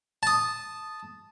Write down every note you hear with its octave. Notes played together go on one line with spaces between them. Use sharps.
A5 D#6